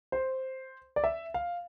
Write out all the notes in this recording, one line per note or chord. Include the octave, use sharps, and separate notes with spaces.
C5
D5
E5
F5